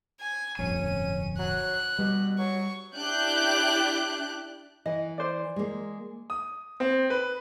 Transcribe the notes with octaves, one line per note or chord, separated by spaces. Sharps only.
G#5
D1 G1 F2 C#4 D#7
F#3 F#6
B2 G3
F#3 C#6
D4 E4 G4 D5 F#6 G6
E3 D#5
C5 D5
G#3 A#3
D#6
C4
B4